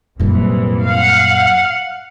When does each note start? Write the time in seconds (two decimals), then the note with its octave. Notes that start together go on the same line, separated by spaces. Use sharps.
0.20 C2 F#2 A#2 E3
0.85 F5 F#5